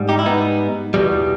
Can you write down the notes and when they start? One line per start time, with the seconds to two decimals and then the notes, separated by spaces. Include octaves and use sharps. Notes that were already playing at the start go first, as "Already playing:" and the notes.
Already playing: G#2 G3
0.09 D#4 G4
0.19 E4
0.26 B3 D#4
0.94 E2 B2 G3